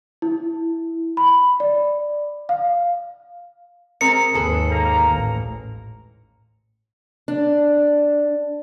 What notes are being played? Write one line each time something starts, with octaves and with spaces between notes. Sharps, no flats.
E4
B5
D5
F5
G#3 C4 A#4 C#7
D#2 G#2 G#4 A4 B4
A#3 A#5
A1
D4